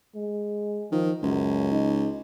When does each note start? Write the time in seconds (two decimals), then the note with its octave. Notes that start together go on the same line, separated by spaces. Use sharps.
0.15 G#3
0.92 D#3 F3
1.23 C#2 F#2
1.72 D#4